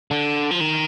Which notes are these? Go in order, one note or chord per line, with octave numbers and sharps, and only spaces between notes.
D3
F3
D#3